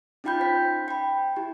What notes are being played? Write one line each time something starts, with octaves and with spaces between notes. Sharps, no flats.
C#4 D#4 F4 G5 B5 G6
C5 B6
G5 B5
E4 G4